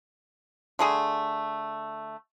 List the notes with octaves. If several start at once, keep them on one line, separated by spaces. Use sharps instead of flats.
D3 A3 G#4